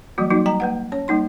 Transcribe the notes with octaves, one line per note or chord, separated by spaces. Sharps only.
E3 F#3 G3 A#3 F#4
F#3 A#3 D#4 F#4
G3 G5 A#5
A#3 B4 F#5
C#4 C#5
G3 A#3 D#4 C6